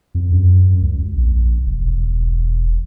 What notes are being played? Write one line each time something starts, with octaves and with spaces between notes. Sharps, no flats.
F2
F#2
C#2
A#1
E1